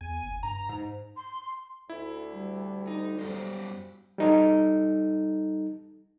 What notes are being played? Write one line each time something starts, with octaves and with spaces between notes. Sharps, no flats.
E2 G#5
F#1
G2 A#5
G#2
C6
D2 E4
G3
D#4
F#2 F#3 G3 C5
G3 D#4 A4